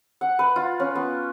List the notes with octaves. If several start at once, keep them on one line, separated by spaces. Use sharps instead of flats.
F#5
B4
F4
C#4
B3